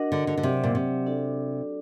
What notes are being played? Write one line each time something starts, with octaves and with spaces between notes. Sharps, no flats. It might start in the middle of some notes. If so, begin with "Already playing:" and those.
Already playing: D4 F#4 A#4 D#5 F#5
D3
D3
D3
C3 F#3 C4 G4 D5 F#5
A#2
C3
D4 F#4 A4 D5